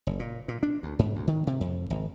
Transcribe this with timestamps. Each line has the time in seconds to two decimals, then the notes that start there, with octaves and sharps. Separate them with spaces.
0.07 F#1
0.19 A#2
0.48 A#2
0.63 D4
0.83 D2
0.99 G#2
1.16 D2
1.27 D#3
1.47 C3
1.61 F2
1.90 G#1